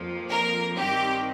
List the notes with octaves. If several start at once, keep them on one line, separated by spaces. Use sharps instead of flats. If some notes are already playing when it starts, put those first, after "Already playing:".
Already playing: F2 F3 A#3
A#4
G2 D#3 C4 G4